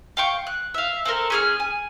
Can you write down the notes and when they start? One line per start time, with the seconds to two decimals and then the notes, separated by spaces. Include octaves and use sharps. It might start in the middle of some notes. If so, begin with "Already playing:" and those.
0.17 F5 G5 C#6
0.47 F#6
0.74 E5 F5
1.05 C4 A4 A#4
1.30 C#4 G#4 F6
1.60 G#5